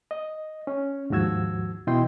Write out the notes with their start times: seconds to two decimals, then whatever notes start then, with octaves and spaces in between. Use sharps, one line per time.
0.11 D#5
0.67 C#4
1.10 D#2 G#2 F3 F#4 E6 G#6
1.87 B2 E3 E4 D#5 G5 C6